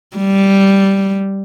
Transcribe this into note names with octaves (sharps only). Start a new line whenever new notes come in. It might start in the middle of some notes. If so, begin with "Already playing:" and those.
G3